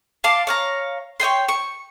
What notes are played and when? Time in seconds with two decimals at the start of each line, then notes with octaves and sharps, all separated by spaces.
0.24 F5 A5 C6 D6
0.47 C#5 F5 A#5
1.20 C#5 D#5 G5 C6
1.48 C#6